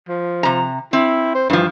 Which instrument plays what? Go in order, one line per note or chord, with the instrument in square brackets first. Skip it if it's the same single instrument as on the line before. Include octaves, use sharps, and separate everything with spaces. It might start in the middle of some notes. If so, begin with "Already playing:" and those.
[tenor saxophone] F3
[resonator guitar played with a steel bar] C3 A#5
[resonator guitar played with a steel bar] C4 [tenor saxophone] E4
[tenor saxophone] C5
[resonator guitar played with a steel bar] G2 F3 [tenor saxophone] E3